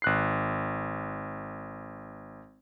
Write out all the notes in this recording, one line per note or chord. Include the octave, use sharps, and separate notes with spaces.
G#1 F#6 C7